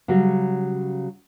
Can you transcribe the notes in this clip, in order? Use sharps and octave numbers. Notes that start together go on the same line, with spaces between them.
C#3 F#3 G3 F#4